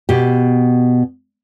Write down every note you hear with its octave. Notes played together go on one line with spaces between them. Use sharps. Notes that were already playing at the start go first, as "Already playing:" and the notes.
B2 G4